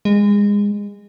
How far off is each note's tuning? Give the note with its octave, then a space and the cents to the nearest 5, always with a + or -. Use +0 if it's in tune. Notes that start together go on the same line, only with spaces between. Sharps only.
G#3 -25